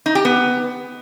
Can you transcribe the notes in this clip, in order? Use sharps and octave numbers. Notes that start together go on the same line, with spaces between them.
D#4
G4
B3